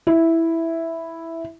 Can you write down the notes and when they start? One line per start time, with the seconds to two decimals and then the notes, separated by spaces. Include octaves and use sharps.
0.07 E4